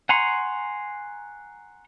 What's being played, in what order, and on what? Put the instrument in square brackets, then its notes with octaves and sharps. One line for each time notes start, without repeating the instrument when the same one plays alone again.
[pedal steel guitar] F#5 G#5 A#5 C6 C#6